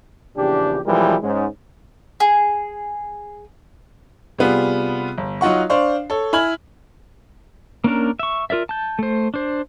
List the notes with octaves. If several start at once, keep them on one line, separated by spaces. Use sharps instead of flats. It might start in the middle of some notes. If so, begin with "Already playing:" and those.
A#1 E2 C#3 D4 G4
B1 E3 F3 G3 G#3 A#4
G#2 G#3 C#4
G#4
C3 G3 B3 F4 G#4
G1
F#3 D#4 F4 F#5 C#6
D4 C5 F5 C#6
A4 C#5
E4 G#5 B5 F6 G#6 F#7
A#3 C#4 D4 A#4
E5 C#6
F4 A#4 D5 E5
A5 G6
A3 C5
D4 C5